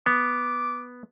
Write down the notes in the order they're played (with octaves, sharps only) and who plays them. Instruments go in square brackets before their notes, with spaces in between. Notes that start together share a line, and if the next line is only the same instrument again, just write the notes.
[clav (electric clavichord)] B3 [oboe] D6